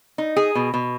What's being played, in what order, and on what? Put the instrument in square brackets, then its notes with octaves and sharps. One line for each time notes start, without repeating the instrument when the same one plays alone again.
[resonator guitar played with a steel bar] D#4
G#4
B2
B2